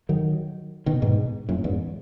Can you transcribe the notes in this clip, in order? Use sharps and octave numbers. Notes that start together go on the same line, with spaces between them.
D#3 F#3
B2 D#3
G#2 B2
F#2 A#2
E2 G#2